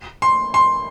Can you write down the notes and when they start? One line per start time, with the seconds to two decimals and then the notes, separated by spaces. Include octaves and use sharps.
0.22 C6
0.54 C6